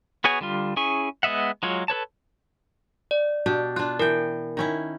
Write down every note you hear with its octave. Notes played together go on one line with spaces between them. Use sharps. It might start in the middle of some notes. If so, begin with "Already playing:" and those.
B3 F#4 G#4 C#5 G#5
D3 G3 F4
C#4 E4 G#4 G#5 C#6
G#3 B3 D#5 E5 F#5
F#3 G#3 F4 C#5
A4 B4 C#5 A5
D5
B2 D4 G4
D4 F4 F#6
E3 A#4 G5
D#3 C#4 E4